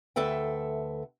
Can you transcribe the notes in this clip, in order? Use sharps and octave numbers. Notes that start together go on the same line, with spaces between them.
D2 A4 B4 E5 G5